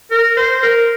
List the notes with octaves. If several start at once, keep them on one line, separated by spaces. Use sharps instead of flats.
A#4
C5
A#4